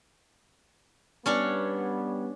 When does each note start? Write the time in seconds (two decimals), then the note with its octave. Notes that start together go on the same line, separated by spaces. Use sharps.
1.26 G3 B3 C#4 D4 C#5